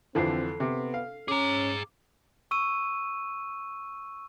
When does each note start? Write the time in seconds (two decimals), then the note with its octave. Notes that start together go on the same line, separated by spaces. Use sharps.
0.15 F2 D3 E3 C4 A4 C7
0.60 C3 B3
0.94 F5
1.28 C#4 G#4 A#5 D6
2.51 C#6 E6 D#7